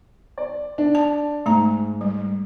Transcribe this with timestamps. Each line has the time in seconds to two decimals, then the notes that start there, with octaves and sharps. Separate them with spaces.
0.38 D5
0.78 D4
0.95 A5
1.46 G#2 A3 A#5
2.01 G3